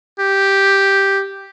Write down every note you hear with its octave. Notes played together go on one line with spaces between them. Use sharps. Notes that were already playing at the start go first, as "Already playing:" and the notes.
G4